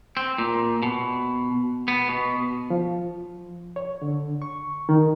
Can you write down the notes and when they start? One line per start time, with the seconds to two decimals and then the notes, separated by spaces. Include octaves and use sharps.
0.17 C4
0.38 A#2
0.82 B2
1.88 B3
2.09 B2
2.70 F3
3.76 C#5
4.02 D3
4.42 C#6
4.89 D#3